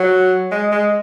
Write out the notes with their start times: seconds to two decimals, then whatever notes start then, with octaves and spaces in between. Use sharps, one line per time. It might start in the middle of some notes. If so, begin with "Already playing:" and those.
Already playing: F#3
0.51 G#3
0.72 G#3